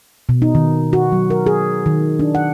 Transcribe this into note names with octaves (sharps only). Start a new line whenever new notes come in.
B2
D#4
D#3
F#4
F#3
A#4
G#4
D#3
D4
F#5